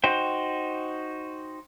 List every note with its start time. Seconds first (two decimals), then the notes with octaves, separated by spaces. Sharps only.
0.04 D#4 F#4 C5 G5